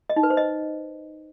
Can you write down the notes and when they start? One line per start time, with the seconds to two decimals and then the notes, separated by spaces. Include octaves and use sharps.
0.10 D#5
0.16 D#4
0.23 B4
0.30 C5
0.37 D#5